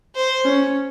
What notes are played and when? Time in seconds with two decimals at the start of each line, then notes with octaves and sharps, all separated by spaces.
0.15 C5
0.45 C#4